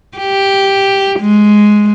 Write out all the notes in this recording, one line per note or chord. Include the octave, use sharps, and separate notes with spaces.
G4
G#3